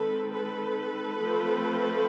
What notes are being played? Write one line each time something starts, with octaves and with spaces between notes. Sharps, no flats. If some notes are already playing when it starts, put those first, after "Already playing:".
Already playing: D#3 G#3 C4 A4 B4
A4 B4
F3 A3 C4